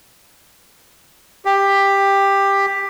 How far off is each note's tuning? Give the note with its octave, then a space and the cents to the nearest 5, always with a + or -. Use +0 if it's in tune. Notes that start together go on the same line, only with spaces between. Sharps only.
G4 +10